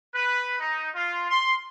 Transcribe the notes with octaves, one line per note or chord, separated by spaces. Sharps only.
B4
D#4
F4
C6